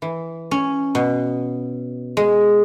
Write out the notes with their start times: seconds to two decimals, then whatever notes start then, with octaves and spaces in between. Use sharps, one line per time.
0.02 E3
0.51 C#4
0.95 B2
2.17 G#3